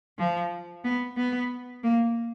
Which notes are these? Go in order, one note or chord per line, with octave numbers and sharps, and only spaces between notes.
F3
B3
B3
A#3